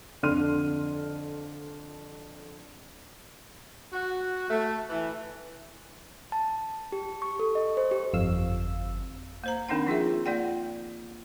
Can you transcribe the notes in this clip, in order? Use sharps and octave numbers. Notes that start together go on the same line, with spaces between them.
F2 D3 D5 C6 F6 D#7
F#4
A3
E3
A5
G4
C#6
A4
D#5
C5
G4
G1 F2 F5 E6
A#3 C5 A#5
D#3 C4 D4 D#4 F#5
F3 F4 G#4 E5
A#3 F4 D5 F#5 G5